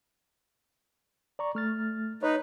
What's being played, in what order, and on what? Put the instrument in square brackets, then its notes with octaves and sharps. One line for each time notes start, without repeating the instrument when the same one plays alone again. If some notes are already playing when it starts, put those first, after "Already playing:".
[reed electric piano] D5 A#5 C#6
A3 F6 A6
[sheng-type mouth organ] D#4 B4 [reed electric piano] C#5